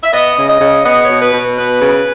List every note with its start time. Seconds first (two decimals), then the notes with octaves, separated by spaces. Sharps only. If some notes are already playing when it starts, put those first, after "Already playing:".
0.03 E5
0.13 B3 D#5
0.37 C#3
0.48 D#5
0.60 C#3
0.84 B3 D#5
1.03 C#5
1.09 B2
1.20 B4
1.33 B2
1.57 B3 B4
1.80 C#3